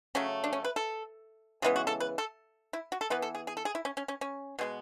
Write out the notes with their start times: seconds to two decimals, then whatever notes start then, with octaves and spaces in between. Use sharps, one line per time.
0.15 C#3 F#3 A3 C#4
0.44 D4
0.53 C#4
0.64 B4
0.76 A4
1.62 C#3 E3 G#3 B3 G#4
1.76 F#4
1.87 A4
2.00 B4
2.18 A4
2.73 E4
2.92 F#4
3.01 A4
3.10 E3 B3 B4
3.22 A4
3.35 G#4
3.47 G#4
3.57 A4
3.65 G#4
3.75 E4
3.85 C#4
3.97 C#4
4.08 C#4
4.21 C#4
4.59 B2 G#3 B3